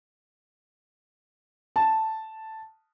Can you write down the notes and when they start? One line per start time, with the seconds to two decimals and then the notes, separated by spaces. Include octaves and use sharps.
1.76 A5